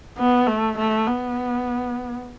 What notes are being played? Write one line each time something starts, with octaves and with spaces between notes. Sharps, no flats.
B3
A3
A3
B3